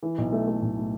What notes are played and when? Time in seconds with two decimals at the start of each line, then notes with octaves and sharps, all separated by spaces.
0.03 E3
0.18 B1
0.32 A3
0.48 A3
0.62 B1
0.77 A2